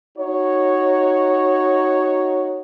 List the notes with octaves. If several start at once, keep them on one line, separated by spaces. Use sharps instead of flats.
D#4 F#4 C#5